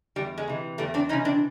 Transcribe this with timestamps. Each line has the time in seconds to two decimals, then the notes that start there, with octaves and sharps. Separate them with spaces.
0.16 E2 G3
0.38 G#3
0.48 C3 E3
0.78 E2 G3 A3
0.94 C4 D4
1.09 E3 C#4 D#4
1.13 C3
1.25 C4 D4